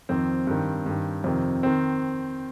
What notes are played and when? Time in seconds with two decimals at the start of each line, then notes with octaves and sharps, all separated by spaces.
0.09 F2 D#3 C4
0.47 G2 D#3
0.86 G2 D#3
1.24 F2 C3 D#3
1.63 D#3 C4